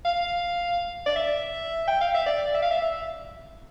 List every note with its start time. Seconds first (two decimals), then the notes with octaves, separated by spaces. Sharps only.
0.05 F5
1.07 D5
1.16 E5
1.88 G5
2.01 F5
2.15 E5
2.27 D5
2.54 E5
2.63 F5
2.71 E5
2.82 E5